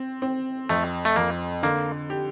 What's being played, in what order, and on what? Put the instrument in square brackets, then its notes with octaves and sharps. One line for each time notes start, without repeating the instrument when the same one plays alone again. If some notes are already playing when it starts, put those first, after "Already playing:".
Already playing: [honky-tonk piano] C4
C4
[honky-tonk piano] F2 [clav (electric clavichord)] A3
[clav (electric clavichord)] A3
[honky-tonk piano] F2 [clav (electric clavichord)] A#3
[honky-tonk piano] D3 [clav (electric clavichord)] A#3
[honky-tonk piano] G4